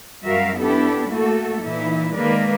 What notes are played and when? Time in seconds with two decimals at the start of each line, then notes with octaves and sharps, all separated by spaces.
0.24 F#2 G3 F#4 A#4 E5 F5
0.59 B3 D4 E4 G4 A4
1.09 A3 A#3 F#4 A4
1.61 A#2 E3 D#4 E4
2.15 D#3 G#3 A#3 A#4 B4 D5